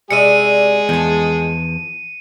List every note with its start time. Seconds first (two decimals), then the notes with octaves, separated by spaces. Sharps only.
0.11 C3 G#3 G#4 D5 E5 C#7 D#7
0.89 E2 F3 A5